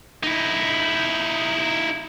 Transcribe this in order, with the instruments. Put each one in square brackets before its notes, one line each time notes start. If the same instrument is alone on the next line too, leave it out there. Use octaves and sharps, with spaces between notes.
[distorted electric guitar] D#4 E4